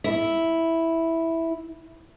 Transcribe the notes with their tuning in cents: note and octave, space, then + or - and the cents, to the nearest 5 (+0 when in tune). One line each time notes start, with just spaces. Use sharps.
E4 -5